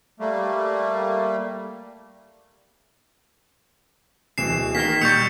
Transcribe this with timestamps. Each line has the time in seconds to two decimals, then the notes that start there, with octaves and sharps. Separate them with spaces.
0.20 G3 A3 A#3
4.38 D1 B2 E3 C7 E7
4.75 D#3 A#3 B6 G7
5.01 A#2 G3 C#6 G6 C#7 F7